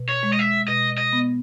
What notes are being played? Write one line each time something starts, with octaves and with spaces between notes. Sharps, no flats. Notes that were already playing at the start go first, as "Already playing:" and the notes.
Already playing: B2
C#5
G#3
D#5
E5
B2 D#5
D#5
B3